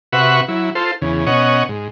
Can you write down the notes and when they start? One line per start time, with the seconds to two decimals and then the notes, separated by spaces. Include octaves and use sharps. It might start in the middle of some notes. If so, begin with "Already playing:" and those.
0.13 C3 F#4 B4 E5 F#5 C#6
0.48 F#3 E4
0.75 F4 A4 C5
1.02 E2 C#3
1.27 B2 C#4 C#5 D#5 F#5
1.69 G#2